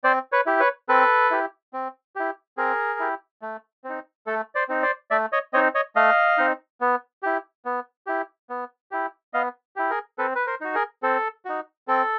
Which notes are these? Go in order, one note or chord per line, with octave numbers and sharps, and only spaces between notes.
C4 C5 D5
B4 C#5
E4 G4
B4 C#5
C4 A4 B4
E4 G4
C4
E4 G4
C4 G#4 A#4
E4 G4
A3
C4
D#4
A3 A4
C5 D5
C4 D#4
C5 D5
A3 D5 E5
C#5 D#5
C4 D#4 C#5 D#5
C#5 D#5
A3 D#5 F5
C4 D#4
B3
E4 G4
B3
E4 G4
B3
E4 G4
B3 D#5 F5
E4 G4
G#4 A#4
C4 A4 B4
B4
A#4 C5
D#4 F#4
G#4 A#4
C4 A4
D#4 F#4
C4 A4